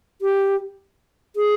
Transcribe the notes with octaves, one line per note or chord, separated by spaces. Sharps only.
G4
G#4